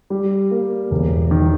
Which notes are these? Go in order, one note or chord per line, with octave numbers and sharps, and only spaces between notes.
G3
A#3
E1
D#3